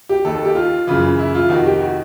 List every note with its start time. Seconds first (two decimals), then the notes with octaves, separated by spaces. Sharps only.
0.09 G4
0.25 D#2 D#3 A4
0.35 A4
0.45 G4
0.55 F4
0.87 F#2 C#3 E3 F4
1.19 E4
1.34 F4
1.49 F2 C3 D#3 F#4
1.66 G4
1.81 F#4